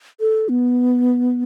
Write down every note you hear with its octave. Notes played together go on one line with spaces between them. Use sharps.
A4
B3